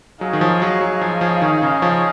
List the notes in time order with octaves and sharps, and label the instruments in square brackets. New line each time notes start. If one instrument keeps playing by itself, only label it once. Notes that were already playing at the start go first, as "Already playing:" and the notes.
[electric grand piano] F#3 [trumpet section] D#4 G#4 C#5 F5
[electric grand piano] D#3
F3
F#3
F#3
F3
F3
D#3
C#3
F3